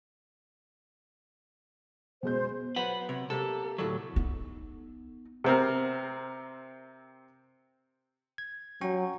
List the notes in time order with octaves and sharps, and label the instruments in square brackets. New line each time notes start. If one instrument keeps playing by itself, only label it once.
[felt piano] B2 G#3 G6 [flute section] C5
[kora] F#3 B3 C5 [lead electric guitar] B4 F#5
[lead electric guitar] C3 [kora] C#5
[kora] C3 A#3 E5 [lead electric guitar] A4
[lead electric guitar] D2 F#3 [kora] A2 A4 E5
[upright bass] B3 D#4
[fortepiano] C3 C4 A#4
[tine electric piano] G#6
[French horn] F#3 [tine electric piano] C#4 G5 C#6